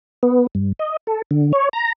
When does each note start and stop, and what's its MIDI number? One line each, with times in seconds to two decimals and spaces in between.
0.23 0.47 59
0.55 0.72 43
0.79 0.97 75
1.07 1.22 69
1.31 1.52 50
1.53 1.69 73
1.73 1.93 82